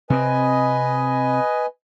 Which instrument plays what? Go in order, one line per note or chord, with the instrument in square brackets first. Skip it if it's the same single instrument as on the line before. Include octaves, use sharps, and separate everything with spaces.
[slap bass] C3 C4 [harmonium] B4 D#5 G#5